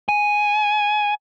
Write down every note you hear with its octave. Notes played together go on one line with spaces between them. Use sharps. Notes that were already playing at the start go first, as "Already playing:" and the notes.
G#5